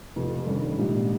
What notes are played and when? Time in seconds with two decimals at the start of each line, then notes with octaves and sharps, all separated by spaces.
0.16 F1 F2 C3
0.46 G2 D#3 G3 C#4
0.77 A#1 G#2 G3